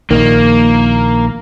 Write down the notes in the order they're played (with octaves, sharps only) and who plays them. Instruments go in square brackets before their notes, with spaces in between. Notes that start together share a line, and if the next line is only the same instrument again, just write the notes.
[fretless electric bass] A#1 D#3 [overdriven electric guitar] A#3